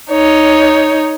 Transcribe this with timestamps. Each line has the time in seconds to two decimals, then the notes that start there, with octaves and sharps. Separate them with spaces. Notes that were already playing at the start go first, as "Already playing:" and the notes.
0.10 D#4 C#5